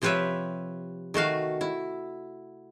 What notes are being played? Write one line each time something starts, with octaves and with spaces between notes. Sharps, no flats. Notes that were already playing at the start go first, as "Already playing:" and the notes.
C3 F3 G4 B4 C#5 E5
D#3 A3 F#4 F5
E4